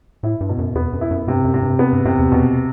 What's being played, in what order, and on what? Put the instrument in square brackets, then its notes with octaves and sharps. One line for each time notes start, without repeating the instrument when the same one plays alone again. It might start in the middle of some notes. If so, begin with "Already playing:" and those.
[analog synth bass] A2 [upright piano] E4
[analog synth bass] G2
[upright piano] B2
[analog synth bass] F#2
[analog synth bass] E2 [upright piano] B3
[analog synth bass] F#2
[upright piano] E4
[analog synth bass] F#2
[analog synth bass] G2 [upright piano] C3
[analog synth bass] F#2
[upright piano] C3
[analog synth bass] G2
[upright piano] B3
[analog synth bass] G2
[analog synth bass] F#2 [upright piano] C3
[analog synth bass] E2
[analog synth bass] E2 [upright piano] B2